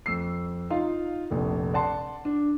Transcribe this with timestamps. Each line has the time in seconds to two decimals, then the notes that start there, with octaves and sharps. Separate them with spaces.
0.06 F2 E6 C7
0.70 D#4 F4 F5
1.30 F1 A#1
1.74 D5 F#5 A5 C6
2.25 D4